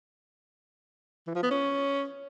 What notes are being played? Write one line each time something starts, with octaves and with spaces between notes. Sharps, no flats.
E3
F3
B3
C#4